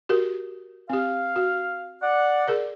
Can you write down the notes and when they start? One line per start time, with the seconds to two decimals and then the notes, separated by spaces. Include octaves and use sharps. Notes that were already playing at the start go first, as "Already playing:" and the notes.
0.09 F#4 G4 A#4
0.89 C4 G4 F5
1.36 F#4
2.01 D5 F#5
2.48 G#4 A#4 D5